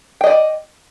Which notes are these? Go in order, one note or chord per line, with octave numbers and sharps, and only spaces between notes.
D5 D#5 G5